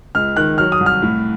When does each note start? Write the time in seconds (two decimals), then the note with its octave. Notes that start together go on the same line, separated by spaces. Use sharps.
0.15 C#2 F6
0.36 D#3 F#6
0.58 F#3 F6
0.72 D#6
0.80 C2
0.86 F6
1.02 A2